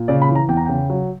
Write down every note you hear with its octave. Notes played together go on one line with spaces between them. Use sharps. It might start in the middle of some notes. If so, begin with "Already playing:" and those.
Already playing: A#2
C#3 D5
B5
E3
A#5
E2 G5
A#5
C#3 G5
F#3